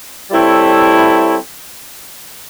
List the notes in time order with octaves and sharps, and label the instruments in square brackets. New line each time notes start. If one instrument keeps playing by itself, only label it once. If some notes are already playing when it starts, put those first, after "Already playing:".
[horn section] G3 C4 E4 A4 C#5